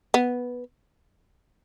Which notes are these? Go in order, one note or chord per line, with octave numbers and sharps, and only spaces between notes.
B3